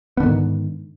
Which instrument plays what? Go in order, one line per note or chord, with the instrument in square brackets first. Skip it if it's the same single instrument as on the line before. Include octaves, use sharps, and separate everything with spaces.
[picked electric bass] B3
D3
D#3
G#2